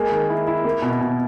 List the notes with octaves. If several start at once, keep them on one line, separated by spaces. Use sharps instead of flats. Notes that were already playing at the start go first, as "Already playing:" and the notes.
Already playing: G#3 A#3
D#3
E4
E4
A#3
B2
B2